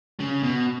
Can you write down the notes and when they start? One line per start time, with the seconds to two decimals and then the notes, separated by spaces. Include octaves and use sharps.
0.20 C#3
0.43 B2